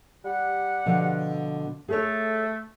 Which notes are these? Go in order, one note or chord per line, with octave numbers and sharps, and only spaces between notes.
G3 G4 F#5
B2 D3 F3
A3 G#4 A4 C#5